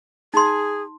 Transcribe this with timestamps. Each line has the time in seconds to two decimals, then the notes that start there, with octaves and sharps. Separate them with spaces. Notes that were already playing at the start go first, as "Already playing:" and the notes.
0.34 D#4 G#4 C6